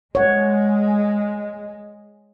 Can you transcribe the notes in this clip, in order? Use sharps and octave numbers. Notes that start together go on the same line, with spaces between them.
G#3 C#5 F#5